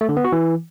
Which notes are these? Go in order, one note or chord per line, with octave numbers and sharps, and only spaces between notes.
A3
D3
B3
F#4
E3